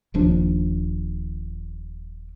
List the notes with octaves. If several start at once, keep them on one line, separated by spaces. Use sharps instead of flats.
D#1 D#2 F3 D4